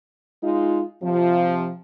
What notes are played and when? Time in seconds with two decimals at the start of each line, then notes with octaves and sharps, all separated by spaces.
0.43 G#3 D#4 F4
1.03 C3 F3